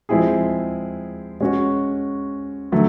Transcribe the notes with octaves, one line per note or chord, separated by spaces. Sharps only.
F3 G#3 C4 E4 G#4
G#3 C#4 F#4
D3 F#3 A3